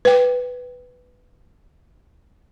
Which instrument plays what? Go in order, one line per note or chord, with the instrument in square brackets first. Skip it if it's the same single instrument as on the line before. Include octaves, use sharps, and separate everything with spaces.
[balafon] B4 G5